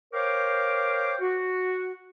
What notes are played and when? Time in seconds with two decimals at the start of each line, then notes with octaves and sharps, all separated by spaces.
0.13 A#4 C5 C#5 F5 G5 D6
1.20 F#4